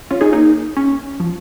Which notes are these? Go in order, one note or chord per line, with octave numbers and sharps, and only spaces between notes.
C#4 F4
D#4 G#4
A#3 D#4
C#4
F3